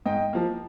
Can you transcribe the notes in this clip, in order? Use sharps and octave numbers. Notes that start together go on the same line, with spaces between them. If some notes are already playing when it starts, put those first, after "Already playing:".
G#2 D#5 G5
F3 A#3